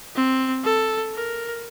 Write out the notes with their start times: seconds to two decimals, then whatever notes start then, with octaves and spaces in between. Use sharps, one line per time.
0.16 C4
0.64 A4
1.14 A#4